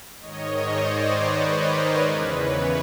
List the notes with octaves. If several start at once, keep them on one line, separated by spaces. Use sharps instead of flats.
G#2 D#3 C#5 D#5
C5 D5
B4
A#4
E2 C#3 E3 B4
B4 C#5